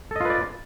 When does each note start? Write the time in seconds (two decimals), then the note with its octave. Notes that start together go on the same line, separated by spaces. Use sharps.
0.11 A4
0.16 D#5
0.20 F4
0.25 B4
0.30 D5